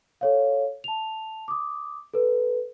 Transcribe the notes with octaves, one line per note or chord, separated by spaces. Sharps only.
A4 C#5 F5
A5 F7
D6 D#6
A4 B4